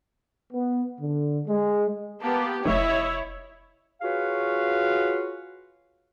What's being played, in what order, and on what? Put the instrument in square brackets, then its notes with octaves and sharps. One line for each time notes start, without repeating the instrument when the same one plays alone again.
[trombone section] B3
D3
G#3
[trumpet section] A#3 A5 [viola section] B3 G4
[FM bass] F1 [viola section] E4 C#5 [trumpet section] D#5 E5
[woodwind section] F4 F#4 G#4 B4 C#5 F5